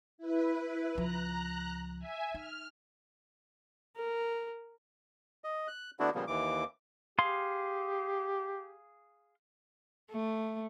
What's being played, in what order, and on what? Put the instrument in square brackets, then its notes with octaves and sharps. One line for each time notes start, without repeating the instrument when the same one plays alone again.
[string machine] E4 B4
[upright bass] C#2 F3 [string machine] A#5 F#6
[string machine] E5 G#5
[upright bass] D#4 [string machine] F6
[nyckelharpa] A#4
[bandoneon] D#5
F#6
D3 A3 B3 D4 E4 F#4
A#2 C#3 F3 G3 A#3 B3
D#2 E3 D6
[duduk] G4 [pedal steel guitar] G#4 F5 C6
[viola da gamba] A3